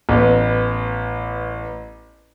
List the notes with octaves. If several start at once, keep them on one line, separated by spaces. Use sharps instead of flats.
A1 B3